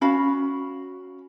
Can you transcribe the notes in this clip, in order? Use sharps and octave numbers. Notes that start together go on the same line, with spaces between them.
C#4 F#4 F5 B5